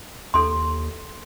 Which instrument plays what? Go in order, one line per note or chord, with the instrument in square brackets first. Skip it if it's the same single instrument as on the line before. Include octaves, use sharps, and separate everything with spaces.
[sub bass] D#2 [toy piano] A4 C6